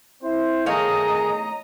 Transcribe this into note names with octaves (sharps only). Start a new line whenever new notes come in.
C4 E4 C5
D#3 A3 G#4 C#5 D#5 F5 A#5